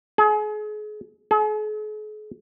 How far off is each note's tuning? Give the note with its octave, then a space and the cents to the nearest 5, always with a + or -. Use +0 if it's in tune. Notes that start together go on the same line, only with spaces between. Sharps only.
G#4 +35
G#4 +45